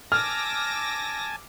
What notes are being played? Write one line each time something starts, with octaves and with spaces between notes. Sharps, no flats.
G#5 A5 D6 E6 F6 A#6